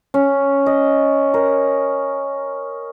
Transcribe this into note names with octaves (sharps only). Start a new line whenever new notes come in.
C#4
D#5
A#4